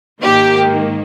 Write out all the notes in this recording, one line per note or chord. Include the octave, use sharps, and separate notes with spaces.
G#2 D#3 A#3 G4